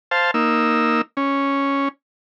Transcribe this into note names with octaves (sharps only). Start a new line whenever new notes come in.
C5 F5 A5
A#3 D#4 E6
C#4